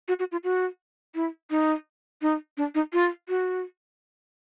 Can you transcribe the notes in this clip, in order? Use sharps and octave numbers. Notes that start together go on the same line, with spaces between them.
F#4
F#4
F4
F#4
E4
D#4
D#4
D4
D#4
F4
F#4